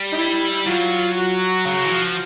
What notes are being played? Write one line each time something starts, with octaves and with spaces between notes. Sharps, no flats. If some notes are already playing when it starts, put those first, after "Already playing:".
Already playing: G3
D#4
E4
F#3 F4
F#4
C#3
E3
F3